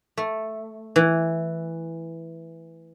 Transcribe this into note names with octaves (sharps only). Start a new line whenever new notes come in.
A3
E3